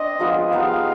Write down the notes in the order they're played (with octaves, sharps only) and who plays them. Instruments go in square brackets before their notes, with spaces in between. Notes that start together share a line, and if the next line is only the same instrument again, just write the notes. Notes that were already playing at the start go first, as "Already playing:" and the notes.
Already playing: [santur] C4 D4 [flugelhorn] D#5
[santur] F3 G#3 B3 F4
[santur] G#3 B3 D#4 G4 [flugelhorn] F5